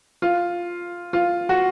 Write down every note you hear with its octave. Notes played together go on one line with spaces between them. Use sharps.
F4
F4
F#4